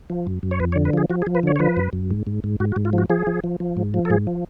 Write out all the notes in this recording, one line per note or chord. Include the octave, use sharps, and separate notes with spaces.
F3
F#2
F#2
C#5
F2 B4
C#5
D3
B4
F3 G#4
F3 F#4
G#4
F3
B4
D3 C#5
C#5
F3 B4
F#2
F#2
G#2
G#2
G#2
G#2 F#4
F#4
G#2
F4
F3
F#4
F3 G#4
F3
F3
F3
G#2
F3
A4
G#2 G#4
F3